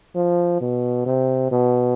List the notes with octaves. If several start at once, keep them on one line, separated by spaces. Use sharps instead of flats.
F3
B2
C3
B2